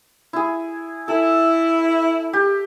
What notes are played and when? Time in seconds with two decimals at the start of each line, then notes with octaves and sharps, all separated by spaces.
0.33 E4 G#4
1.08 E4 A4
2.33 G4